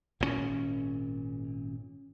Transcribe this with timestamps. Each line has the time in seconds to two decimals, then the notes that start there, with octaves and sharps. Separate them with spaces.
0.20 G#1 A#2 D3 C#4